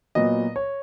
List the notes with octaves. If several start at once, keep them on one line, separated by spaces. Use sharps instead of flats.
A#2 F#3 B3 D#5
C#5